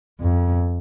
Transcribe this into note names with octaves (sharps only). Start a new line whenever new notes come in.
F2